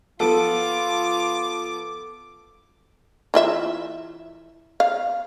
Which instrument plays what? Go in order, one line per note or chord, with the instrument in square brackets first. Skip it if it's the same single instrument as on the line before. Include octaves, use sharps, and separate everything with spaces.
[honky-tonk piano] F3 B3 [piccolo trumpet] F4 [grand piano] A4 [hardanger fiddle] D6
[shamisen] E3 F4 E5
F5